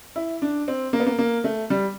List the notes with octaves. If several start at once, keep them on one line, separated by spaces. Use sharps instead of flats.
E4
D4
C4
A#3
B3
A#3
A#3
A3
G3